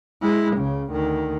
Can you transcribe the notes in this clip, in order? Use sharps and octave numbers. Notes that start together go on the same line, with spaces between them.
G#3 E4
C#2 C#3
D2 D#3